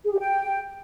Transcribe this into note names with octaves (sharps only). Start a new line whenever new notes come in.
G#4
G4
G5